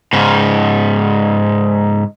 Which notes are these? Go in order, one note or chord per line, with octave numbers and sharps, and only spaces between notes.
G#2 C#3